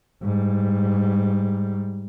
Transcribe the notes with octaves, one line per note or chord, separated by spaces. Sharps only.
G#2 G3